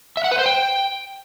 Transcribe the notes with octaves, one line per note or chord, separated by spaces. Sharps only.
E5
F#5
B4
C5
G5